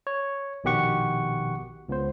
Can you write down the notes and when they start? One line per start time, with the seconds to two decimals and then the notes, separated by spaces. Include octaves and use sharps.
0.07 C#5
0.64 A#1 B2 D#3 G4 F#5 C#6
1.89 C#2 B3 C5